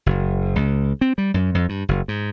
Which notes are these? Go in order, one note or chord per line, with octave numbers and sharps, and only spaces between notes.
F#1
C#2
C4
G3
F#2
F2
G2
F#1
G#2